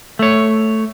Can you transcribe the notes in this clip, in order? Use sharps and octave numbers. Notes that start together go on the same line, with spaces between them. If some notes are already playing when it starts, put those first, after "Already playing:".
A3 C#5